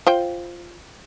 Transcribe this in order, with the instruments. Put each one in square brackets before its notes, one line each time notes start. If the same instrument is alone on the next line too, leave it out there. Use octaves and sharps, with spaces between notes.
[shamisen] F4 C5 G5